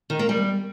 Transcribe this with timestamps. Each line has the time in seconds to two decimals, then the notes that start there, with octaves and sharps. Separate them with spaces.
0.10 D#3
0.19 A#3
0.29 G3